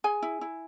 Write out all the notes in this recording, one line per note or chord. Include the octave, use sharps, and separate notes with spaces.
G#4 G#5
E4
E4